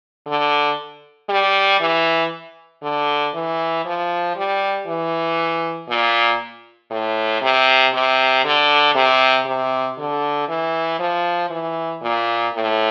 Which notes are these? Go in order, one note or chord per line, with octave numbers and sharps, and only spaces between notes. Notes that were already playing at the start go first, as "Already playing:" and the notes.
D3
G3
E3
D3
E3
F3
G3
E3
A#2
A2
C3
C3
D3
C3
C3
D3
E3
F3
E3
A#2
A2